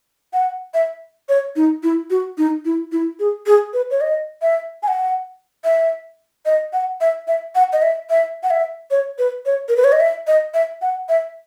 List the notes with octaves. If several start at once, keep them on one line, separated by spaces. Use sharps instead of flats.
F#5
E5
C#5
D#4
E4
F#4
D#4
E4
E4
G#4
G#4
B4
C#5
D#5
E5
G#5
F#5
E5
D#5
F#5
E5
E5
F#5
D#5
E5
E5
F#5
E5
C#5
B4
C#5
A#4
B4
C#5
D#5
E5
D#5
E5
F#5
E5